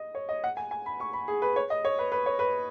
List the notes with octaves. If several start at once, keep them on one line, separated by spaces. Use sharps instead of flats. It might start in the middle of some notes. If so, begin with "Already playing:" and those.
Already playing: D#5
C#5
D#5
F#5
G#5
G#5
B5
C#6
B5
G#4
B4
C#5
D#5
C#5
B4
B4
C#5
B4